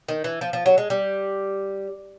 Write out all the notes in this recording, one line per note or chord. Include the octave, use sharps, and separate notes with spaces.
D#3
E3
F3
F3
F#3
G#3
G3